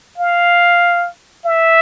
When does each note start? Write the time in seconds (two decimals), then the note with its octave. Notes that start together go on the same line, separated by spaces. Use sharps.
0.18 F5
1.46 E5